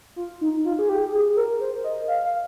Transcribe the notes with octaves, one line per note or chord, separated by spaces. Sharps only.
F4
D#4
F4
G#4
G4
G#4
A#4
C5
D#5
F5
F5